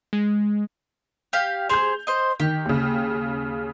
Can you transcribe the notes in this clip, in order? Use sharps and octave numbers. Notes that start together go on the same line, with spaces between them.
G#3
G4 F5
G#4 C5 G6 F7
C5 D#5
D#3 G4
D#2 C#3